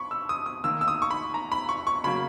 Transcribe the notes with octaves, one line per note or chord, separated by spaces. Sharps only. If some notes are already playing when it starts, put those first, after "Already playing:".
Already playing: B5 C#6
E6
D#6
D#6
D#3 A#3 E6
E6
D#6
C#6
B5
A#5
B5
C#6
C#6
C#3 F#3 A#3 B5